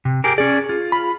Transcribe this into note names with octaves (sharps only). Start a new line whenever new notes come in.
C3
G4 G#4 A#4
C#4 G#4 D5
F4
B5